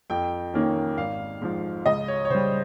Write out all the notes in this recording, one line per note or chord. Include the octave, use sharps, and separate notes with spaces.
F2 G5
D#3 A#3 C#4
G#1 F5
G#2 F3
C#2 D#5
C#5
C#5
C#3 G3 C5